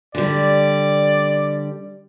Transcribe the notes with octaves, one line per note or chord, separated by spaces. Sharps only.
D3 G3 D5